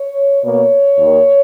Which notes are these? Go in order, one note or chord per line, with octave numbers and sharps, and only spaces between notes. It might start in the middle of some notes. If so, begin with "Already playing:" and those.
Already playing: C#5
B2 A#3 C#5
D#2 D#3 A#3